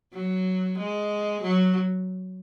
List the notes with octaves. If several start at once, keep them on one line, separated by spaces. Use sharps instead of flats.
F#3
G#3
F#3